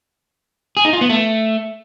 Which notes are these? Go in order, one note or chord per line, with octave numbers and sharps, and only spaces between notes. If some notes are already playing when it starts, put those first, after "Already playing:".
G#4
D#4
F4
B3
A3